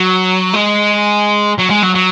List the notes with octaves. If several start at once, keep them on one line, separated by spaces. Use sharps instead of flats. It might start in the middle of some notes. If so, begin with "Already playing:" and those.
Already playing: F#3
G#3
F#3
G#3
F#3
F#3